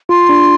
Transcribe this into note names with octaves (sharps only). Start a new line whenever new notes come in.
F4 C6
D4